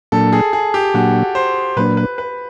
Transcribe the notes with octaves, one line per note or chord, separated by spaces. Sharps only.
A#2 F#3 A#3 D4 A4
G#4
G#4
G4
A#2 F#3 A#3 D4 F#4
C5
A#2 F#3 A#3 D4 B4
B4
B4